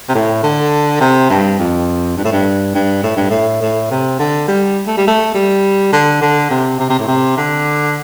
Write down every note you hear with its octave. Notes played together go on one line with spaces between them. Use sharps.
C3
A2
D3
C3
G2
F2
G2
A2
G2
G2
A2
G2
A2
A2
C3
D3
G3
A3
G3
A3
G3
D3
D3
C3
C3
C3
A2
C3
D3